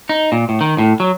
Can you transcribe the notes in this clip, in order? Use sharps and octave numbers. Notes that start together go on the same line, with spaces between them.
D#4
A#2
A2
D#3
A2
F#3